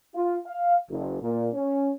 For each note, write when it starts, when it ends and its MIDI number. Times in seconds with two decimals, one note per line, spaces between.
0.15 0.38 65
0.46 0.76 77
0.90 1.17 30
1.21 1.49 46
1.53 1.92 61